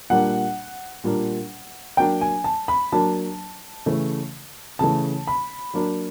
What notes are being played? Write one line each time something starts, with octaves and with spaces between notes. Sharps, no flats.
A#2 G3 A#3 D4 F#5
A#2 G3 A#3 D4
F#3 A#3 D4 G5
G#5
A5
B5
F#3 A#3 D4 A5
C#3 E3 A3
C#3 E3 A3 A5
B5
F#3 A#3 D4